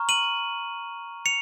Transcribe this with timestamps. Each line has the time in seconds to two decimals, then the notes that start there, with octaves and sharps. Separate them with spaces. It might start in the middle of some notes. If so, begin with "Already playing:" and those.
Already playing: A#5 C#6 F6
0.09 D#7 F#7
1.26 C#7 F7